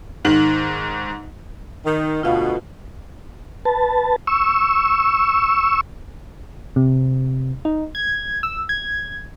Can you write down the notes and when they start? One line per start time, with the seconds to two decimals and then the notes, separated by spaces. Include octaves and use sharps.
0.25 G#2 D#3 F#7
1.85 D#3
2.23 D2 B2 F4 F5
3.65 B4 A5
4.27 C#6 E6
6.76 C3
7.65 D#4
7.95 G#6
8.43 E6
8.69 G#6